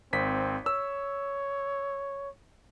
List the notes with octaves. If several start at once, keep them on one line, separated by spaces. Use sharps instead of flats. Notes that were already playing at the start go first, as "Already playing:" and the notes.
G#1 C4 B6
C#5 E6